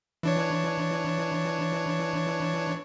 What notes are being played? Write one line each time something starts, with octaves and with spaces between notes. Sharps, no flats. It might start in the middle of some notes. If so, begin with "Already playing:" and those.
E3 D4 C#5